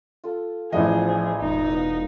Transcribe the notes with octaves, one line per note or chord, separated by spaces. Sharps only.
F4 A4
A1 F3 A#3 B3 D4 G#4 D#5
E1 D#4
B4 F5